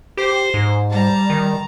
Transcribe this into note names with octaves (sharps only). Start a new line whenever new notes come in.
G4 C5
G#2
G3 A5 A#5
D#3